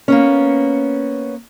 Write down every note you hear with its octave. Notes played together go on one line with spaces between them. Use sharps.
A#3 B3 C#4